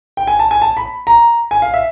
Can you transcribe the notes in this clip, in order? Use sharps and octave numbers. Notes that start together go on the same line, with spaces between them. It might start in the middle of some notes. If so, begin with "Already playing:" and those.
G5
G#5
A5
G#5
A5
B5
A#5
G#5
F5
E5